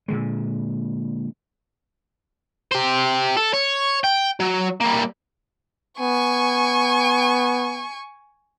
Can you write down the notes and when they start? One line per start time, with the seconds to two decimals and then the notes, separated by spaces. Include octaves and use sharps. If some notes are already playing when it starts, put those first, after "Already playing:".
0.08 A#2 D3 G#3
2.72 G4 C5
3.37 A4
3.54 C#5
4.04 G5
4.40 F#3
4.81 G3 A#3
6.00 B3 G#5 C#6